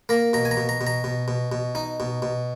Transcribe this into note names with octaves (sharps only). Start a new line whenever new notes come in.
A#3 A#5
B2 A#5
G#5
A#5
B2
A#5
B2
A#5
B2
B2
B2
D#4
B2
B2